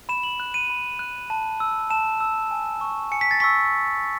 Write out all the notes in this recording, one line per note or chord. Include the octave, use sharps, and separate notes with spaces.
B5 E7
F#7
F#6
D#7
B5
F#6
A5
E6
A5 E7
E6
G#5
C#6 E6
G#5 C#7
B6
A6
C#6 E6 B6